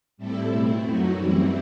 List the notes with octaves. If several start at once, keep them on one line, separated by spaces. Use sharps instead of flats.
A2 G3 C4 E4 A4
B2 A3 C4 E4
F#2 F#3 A3 D#4 F#4
F#2 E3 G3 C4 E4